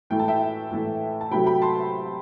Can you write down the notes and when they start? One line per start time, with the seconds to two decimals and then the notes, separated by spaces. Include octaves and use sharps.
0.10 A2 E3 A3 G5
0.19 A5
0.28 E5 G5
0.71 A2 E3 A3
1.21 A5
1.31 C3 F#3 A3 G5 B5
1.46 G5 B5
1.62 A5 C6